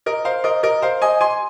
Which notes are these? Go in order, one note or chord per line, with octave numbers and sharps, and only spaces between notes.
A#4 D#5
C5 F5
A#4 D#5
A#4 D#5
C5 F5
D#5 G#5
G#5 C6